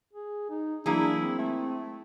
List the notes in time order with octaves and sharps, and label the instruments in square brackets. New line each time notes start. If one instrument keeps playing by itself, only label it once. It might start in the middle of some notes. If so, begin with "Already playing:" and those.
[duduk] G#4
D#4
[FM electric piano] E3 F#3 [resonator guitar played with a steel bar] A#3 G#4 [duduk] D4 [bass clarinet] E4
[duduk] C4
[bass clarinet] A3 [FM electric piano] E4 E5